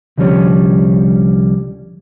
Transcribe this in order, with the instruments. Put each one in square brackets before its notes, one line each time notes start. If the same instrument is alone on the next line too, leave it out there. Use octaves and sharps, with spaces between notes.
[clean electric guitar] C2 D3 F3 G3 C#4 C#5